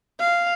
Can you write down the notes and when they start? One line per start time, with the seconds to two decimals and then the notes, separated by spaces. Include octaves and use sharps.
0.19 F5